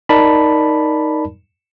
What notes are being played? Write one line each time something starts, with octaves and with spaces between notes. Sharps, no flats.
D#4 A#4 D5 A5 B5